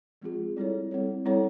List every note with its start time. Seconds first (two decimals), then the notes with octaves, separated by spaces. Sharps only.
0.22 F3 G#3 C4 F4 G#4
0.57 G3 C4 E4 A4 C#5
0.91 G3 C4 E4 A4 C#5
1.25 G3 C4 E4 A4 C#5